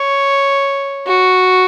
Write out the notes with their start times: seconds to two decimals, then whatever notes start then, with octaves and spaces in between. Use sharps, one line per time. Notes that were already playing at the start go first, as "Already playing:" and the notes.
Already playing: C#5
1.07 F#4